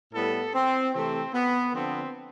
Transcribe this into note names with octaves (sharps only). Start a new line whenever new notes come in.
A2 G3 B3 A4
C4
C3 E3 A3 C4
B3
D3 F3 B3 C4